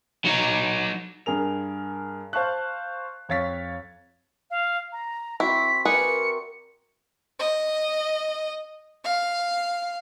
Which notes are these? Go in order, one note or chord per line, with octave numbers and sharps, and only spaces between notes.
F#3 D#4
G2 G#4 A#4 F7
C5 F5 A5 C#6 F#6
F2 C#5 F5 A6 B6
F5
A#5
C4 E4 F#4 B6
G#4 A#4 B4 D5 E5 C#7
D#5
F5